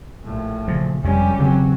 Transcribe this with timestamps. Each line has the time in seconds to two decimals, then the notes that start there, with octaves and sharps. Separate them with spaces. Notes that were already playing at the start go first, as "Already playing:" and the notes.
0.24 A#1 A2
0.68 A#2 C#3 F3
1.04 F1 F2 G3 G#3 C#4 G4
1.39 E1 C#3 F#3 C4